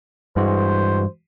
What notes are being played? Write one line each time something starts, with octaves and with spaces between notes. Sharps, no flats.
G2 E3 G#3 F#4 C5